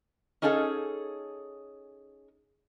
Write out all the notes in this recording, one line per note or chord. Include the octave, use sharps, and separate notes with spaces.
C#4 D#4 G#4 A4 F5